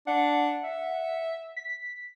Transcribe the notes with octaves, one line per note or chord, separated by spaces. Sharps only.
D4 F#5
E5
B6